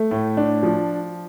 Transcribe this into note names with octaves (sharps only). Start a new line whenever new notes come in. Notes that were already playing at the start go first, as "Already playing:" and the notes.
Already playing: A3
A2
D4
F3